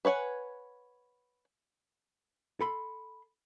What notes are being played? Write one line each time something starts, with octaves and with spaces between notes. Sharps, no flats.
B4 C#5 F#5 G#5
A4 B5 C6